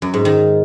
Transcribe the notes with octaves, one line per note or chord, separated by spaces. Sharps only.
F#2
G#2
D#3